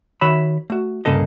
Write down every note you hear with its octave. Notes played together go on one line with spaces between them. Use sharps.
D#3 F#4 C#5 E5 B5
A3 F#4
C2 G2 C#3 A#3 A4 D#5